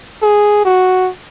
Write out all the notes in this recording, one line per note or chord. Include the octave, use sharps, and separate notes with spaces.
G#4
F#4